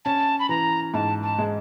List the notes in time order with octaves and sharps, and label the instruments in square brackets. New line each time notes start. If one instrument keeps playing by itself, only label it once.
[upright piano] C#4 [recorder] A5
[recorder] B5
[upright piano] E3 [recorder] A#5
[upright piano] G#2 [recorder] A5
[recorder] A5
[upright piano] G#3